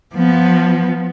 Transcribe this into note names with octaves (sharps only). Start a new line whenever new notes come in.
F3 B3